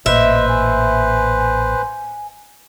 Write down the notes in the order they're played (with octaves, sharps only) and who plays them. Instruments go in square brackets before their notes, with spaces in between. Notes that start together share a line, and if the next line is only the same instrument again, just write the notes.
[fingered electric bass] A1 A#2 [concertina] B4 C5 [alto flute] D#5 [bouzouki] E5
[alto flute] G#5